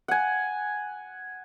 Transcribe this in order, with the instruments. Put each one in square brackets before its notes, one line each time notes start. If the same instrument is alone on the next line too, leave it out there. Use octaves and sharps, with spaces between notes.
[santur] F#5 G#5